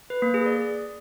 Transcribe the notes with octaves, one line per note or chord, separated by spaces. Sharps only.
B4
A#3
G#4
D5